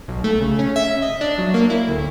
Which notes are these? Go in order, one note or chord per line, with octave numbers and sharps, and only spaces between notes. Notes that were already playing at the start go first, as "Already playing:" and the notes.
B1
A3
C#3
C#4
E5
D#5
D4
F#3
A#3
E4
D2